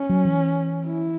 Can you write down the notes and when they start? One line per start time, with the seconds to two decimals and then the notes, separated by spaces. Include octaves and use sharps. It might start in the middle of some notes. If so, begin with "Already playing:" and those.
Already playing: C#4
0.09 F#3
0.25 E3
0.86 E4